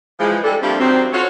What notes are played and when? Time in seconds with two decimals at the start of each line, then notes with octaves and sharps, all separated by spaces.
0.18 E3 F3 G#3
0.43 G3 G#3 D4 A4
0.62 F3 G3 A3 A#3 C4 D4
0.79 D#3 F#3 G3 C4
1.12 F4 F#4 A4 C5 C#5